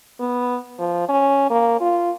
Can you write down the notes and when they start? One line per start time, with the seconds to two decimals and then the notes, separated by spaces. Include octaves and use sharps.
0.20 B3
0.79 F3
1.09 C#4
1.50 A#3
1.81 F4